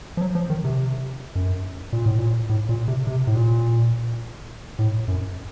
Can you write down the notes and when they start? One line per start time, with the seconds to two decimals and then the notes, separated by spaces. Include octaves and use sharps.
0.17 F3
0.21 F#3
0.35 F3
0.50 D#3
0.64 C3
1.36 F#2
1.93 A#2
2.06 A2
2.19 A#2
2.50 A2
2.69 A#2
2.88 C3
3.07 C3
3.27 A2
3.35 A#2
4.79 A2
5.08 F#2